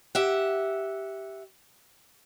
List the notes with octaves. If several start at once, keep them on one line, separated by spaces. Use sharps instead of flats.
G4 E5 F#5